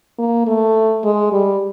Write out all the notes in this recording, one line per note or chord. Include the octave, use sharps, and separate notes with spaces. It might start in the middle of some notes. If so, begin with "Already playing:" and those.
A#3
A3
G#3
G3